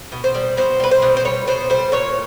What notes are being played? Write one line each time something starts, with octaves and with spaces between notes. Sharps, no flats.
B2
C5
G3
B2 C5
G3 B4
C5
B2
C5
G3 C#5
B2 C5
G3 C5
A#2 C#5